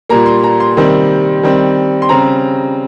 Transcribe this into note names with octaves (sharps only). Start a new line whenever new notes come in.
A#2 G3 A#3 A#5
C6
A#5
C6
C3 D#3 G3 C4
D#3 G3 C4
C6
C#3 G3 C4 A#5